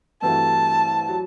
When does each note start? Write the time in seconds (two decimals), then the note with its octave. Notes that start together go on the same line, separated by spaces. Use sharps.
0.22 G2 E3 A3 C4 F#4 A5
1.09 F#3